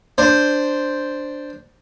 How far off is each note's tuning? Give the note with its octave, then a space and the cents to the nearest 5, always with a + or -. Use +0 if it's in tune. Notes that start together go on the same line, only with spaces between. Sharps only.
D4 +0 C5 +0